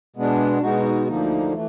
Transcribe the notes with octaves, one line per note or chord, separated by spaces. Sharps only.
B2 G#3 B3 D4
B2 G#3 B3 D#4 F#4
D2 D3 F3 A#3 D#4
E3 A3